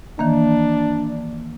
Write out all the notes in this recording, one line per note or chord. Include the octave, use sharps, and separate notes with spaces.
D#3 E3 A#3 D4